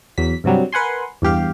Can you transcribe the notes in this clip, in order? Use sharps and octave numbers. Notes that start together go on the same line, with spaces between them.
E2 F#3 B6
G2 C3 F#3 G3
A#4 B4 F#5 G#5 C6
E2 G2 G4 F5